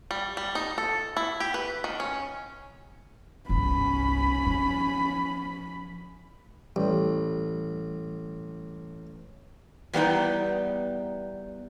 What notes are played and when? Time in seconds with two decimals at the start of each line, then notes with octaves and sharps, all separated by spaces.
0.11 G3
0.37 G3
0.55 D#4
0.78 A4
1.17 E4
1.40 G4
1.54 B4
1.84 D#3
2.00 C#4
3.49 G1 C2 C#4 B5
4.46 F3
6.76 A1 G3
9.93 E2 G3 B3 D4 D#4 G5